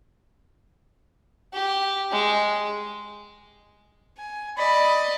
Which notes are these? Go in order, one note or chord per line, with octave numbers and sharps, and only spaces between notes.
G4
G#3
G#5
D5 D#5 B5